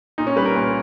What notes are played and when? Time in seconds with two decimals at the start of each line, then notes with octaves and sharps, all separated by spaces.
0.18 A#2 D#4
0.27 C#4
0.36 G3 B4
0.45 A#4
0.56 A#2